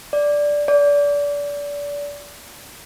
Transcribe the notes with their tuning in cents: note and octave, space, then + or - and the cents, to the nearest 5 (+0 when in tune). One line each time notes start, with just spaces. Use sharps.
D5 -5
D5 -30